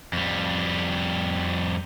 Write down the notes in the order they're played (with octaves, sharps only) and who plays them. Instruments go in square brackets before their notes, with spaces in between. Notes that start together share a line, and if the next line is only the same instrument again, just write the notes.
[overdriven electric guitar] F2 G3